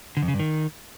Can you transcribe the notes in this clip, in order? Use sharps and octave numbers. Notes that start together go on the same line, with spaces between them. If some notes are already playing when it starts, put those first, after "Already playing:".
D3
F2
C#3
G2
D#3